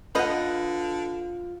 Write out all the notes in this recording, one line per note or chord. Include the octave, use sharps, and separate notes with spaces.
D3 F4 B4 D#5 F#5